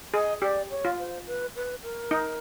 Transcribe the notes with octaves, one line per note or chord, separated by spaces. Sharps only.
G#4 D#5
G4 D5
C#5
F4
C5
B4
B4
A#4
D#4